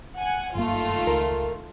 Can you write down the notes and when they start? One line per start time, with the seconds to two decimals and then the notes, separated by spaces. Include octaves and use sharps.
0.18 F#5 G#5
0.55 F#1 G2 D#3 A3 A#3 F4
1.07 C#2 A#4